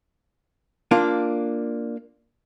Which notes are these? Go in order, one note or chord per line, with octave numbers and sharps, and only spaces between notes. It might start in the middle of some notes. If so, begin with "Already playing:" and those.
A#3 D4 F4